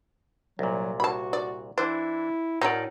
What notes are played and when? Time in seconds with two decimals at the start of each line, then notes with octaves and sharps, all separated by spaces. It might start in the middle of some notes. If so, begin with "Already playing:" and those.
0.59 C2 A#2 F#3
1.00 F#4 A5 B5
1.33 D5
1.78 E3 D4 E4 C5
2.61 A2 F#3 C#4 D#4 A#4 D5